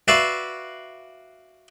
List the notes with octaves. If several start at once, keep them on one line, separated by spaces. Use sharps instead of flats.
F#4 B4 D5 E5 F5